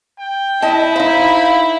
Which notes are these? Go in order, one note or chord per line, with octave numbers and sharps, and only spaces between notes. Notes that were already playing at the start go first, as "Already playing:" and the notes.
G5
E4 D#5 A5
D#4 C5 F5 B5